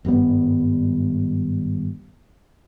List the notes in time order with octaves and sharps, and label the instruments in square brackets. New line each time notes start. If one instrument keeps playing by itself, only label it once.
[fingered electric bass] G#1 G2 G3 B3